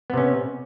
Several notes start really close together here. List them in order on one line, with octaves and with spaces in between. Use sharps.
B3 C3 C#4